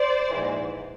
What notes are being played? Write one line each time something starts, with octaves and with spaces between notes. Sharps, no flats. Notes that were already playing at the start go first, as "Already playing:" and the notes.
Already playing: C5 D5
A#1 G#2 E3